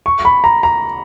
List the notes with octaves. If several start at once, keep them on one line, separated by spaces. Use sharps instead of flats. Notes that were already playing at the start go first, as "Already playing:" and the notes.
C#6
B5
A#5
A#5